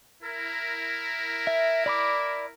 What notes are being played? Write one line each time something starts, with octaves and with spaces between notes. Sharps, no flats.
E4 A#4
E5
D5 B5 D6